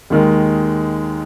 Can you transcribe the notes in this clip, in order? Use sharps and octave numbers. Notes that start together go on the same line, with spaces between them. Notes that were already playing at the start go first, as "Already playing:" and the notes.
D#2 D#3 G#3